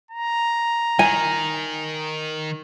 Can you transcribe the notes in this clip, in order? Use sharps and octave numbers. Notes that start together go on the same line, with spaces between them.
A#5
D#3 G#5